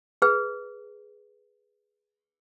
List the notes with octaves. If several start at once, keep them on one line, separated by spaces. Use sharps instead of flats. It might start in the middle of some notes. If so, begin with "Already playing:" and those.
G#4 B4